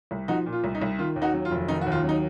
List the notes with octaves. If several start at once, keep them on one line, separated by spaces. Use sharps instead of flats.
C2
F3 D#4 F#4
A#2
F4
C2
D#4
C2
D#3 F4
D#2
D#4 F#4
F#3
F4
F1
D#3 D#4
F#4
D#2
F4
F#3
D#4